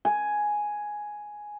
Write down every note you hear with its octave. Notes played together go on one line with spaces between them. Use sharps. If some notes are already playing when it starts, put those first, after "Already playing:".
G#5